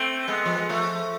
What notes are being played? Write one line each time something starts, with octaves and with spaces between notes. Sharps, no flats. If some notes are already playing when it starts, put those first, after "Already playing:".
Already playing: A3 C4
G#3 B3
F3
G#3
F3 A3